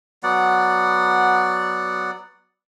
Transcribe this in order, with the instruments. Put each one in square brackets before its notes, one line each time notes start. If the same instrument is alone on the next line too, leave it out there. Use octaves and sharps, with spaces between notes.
[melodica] F#3 B3 D5 F#5